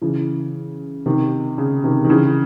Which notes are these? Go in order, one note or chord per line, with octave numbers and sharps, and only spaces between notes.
C#3 E3
C3 D#3
C#3
C3 D#3
D#3
C#3 E3